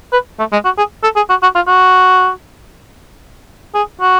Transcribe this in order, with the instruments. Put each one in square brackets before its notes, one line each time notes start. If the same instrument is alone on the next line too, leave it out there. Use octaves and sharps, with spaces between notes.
[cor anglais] B4
A3
G#3
F#4
G#4
A4
G#4
F#4
F#4
F4
F#4
G#4
F#4